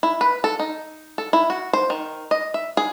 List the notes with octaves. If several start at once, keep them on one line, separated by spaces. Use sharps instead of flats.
E4
B4
A4
D#4
A4
E4
F#4
C5
D#3
D#5
E5
G#4